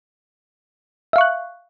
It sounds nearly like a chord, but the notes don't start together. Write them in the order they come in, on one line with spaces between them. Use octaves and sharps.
E5 F5 C#6 F#6